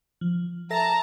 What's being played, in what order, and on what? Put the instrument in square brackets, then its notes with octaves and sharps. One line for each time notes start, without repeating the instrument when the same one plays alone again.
[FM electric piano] F3
[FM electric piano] A4 E5 A#6 [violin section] A5 A#5